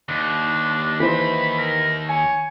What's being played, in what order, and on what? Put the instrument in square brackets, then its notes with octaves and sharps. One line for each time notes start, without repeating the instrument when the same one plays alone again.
[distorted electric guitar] D#2 [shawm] D4
[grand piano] E3 C5 [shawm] B5
[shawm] A#4
[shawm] C#5 [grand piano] G#5